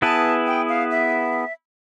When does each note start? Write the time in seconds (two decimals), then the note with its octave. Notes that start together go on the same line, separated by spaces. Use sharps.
0.02 B3 E4 G#4 B4 A5
0.46 G5
0.69 F5
0.91 E5